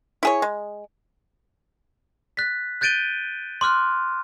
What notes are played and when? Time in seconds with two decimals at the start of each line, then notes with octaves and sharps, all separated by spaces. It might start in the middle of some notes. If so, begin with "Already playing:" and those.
0.23 E4 G#4 C#5
0.42 G#3
2.37 F#6 A6 B6
2.81 F#6 G6 A6 D7 D#7 G7
3.61 C6 D6 F6 F#6